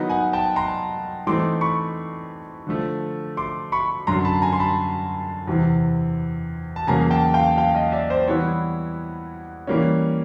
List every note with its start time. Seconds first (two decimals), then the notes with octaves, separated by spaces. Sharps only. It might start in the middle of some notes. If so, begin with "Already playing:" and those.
Already playing: D#3 F#3 B3 D#4
0.09 F#5 G#5
0.33 G5 A5
0.56 A#5 C6
1.27 E3 A3 C4 D#4 C6 D6
1.61 B5 C#6
2.67 D3 F3 A3
3.37 C6 D6
3.72 B5 C#6
4.07 F#2 D3 F#3 A#5 C6
4.25 A5 B5
4.42 G#5 A#5
4.53 C6
4.60 A5 B5
5.47 E2 C3 E3
6.76 A5
6.87 E2 C#3 F#3 A#3 G#5 A#5
7.11 G5 A5
7.34 F5 G5
7.58 F5 G5
7.75 D#5 F5
7.92 D5 E5
8.10 C5 D5
8.28 E3 G3 B3 E4 C#5
9.67 E3 G3 A#3 C#4